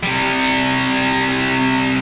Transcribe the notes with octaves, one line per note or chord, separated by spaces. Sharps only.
C3 G3